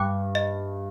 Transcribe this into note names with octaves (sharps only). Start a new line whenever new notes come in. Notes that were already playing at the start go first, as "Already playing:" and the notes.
Already playing: G2 G5 D6 F#6
D#5